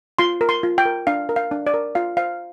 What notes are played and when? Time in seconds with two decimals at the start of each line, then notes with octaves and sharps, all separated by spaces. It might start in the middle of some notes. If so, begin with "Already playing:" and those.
0.19 F4 C6
0.41 A#4
0.49 C6
0.63 F4
0.78 G5
0.85 A#4
1.07 D4 F5
1.29 A#4
1.36 F5
1.51 D4
1.67 D5
1.74 A#4
1.95 F4 F5
2.17 C5 F5